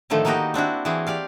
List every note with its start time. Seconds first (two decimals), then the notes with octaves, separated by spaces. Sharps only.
0.10 A2 D3 D#3 F3 A3
0.25 A#3 B3 D#4 F#4 G4 D#5
0.54 C4 D4 E4 F#4
0.85 E3 C4 F#4 G#4
1.07 G4 D5 F5